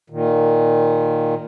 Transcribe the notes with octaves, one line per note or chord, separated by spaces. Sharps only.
A#2 D#3